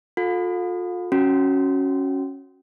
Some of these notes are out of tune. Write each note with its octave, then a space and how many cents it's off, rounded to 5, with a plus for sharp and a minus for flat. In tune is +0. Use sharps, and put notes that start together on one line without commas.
F4 +35 A4 +0 F5 +45
C#4 -10 F#4 +0